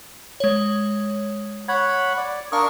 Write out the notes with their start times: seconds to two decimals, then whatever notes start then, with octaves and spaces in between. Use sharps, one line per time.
0.40 G#3 C#5
1.68 C#5 F#5 B5 G#6
2.17 D5
2.52 D4 A#4 F5 C#6 D#6